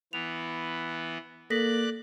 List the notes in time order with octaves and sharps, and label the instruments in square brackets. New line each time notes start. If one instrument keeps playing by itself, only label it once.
[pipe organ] E3 B3 [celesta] F7
[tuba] A#3 [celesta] A4 A#6 B6 [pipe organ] D5 F#6